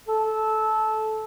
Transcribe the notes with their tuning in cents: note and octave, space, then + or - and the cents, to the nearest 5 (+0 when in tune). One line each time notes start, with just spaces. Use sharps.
A4 -15